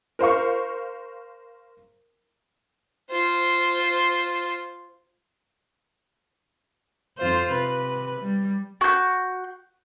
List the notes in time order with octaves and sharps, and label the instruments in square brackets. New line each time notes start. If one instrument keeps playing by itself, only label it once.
[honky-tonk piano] A#4 C5 F5 C#6
[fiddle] F4 C5
[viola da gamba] F2 F4 C5
C3 B4
G3
[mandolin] F#4 G6